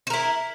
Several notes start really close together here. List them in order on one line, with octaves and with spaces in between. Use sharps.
C5 A#4 E4